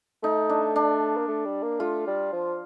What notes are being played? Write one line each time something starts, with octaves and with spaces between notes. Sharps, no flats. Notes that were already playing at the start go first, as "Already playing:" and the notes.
A3 D#4
D4
D4
A#3
A3
G3
A#3
A3 F4
G3
F3